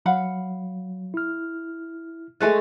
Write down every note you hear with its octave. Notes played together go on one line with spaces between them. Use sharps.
F#3 F5 F#5 B5
E4 F6
G#3 A3 B4 G#5 A5